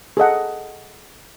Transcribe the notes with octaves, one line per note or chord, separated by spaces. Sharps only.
G#4 A4 D#5 F#5